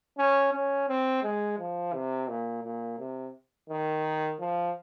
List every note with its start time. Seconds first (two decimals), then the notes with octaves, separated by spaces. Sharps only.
0.18 C#4
0.52 C#4
0.88 C4
1.23 G#3
1.59 F3
1.94 C3
2.28 A#2
2.64 A#2
2.99 C3
3.69 D#3
4.40 F3